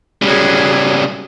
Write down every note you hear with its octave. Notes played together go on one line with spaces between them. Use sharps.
C#3 F#3 G3 G#4